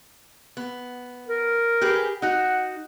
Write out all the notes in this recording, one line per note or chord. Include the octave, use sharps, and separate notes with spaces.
B3
A#4
G4 G#4 B4
D#4 F#4 F#5